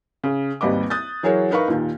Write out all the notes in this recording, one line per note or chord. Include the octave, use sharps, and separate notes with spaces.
C#3
G#1 D#2 G3 B4 D#5 D6
D#6 F#6 G6 A6
E3 F#3 G#4 A#4 C#5
D#4 A#4 B4 F5 C#6
D#2 A#2 D#3